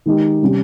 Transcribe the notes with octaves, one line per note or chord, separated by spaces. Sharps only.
D#3 G#3 D#4 G4
C3 G3 C#4 G4